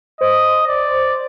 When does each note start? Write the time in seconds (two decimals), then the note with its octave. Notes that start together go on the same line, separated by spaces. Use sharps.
0.21 C5 D#5
0.67 D5